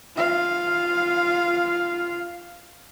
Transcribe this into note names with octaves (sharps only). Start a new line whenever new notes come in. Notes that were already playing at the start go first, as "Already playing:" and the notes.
F4 F5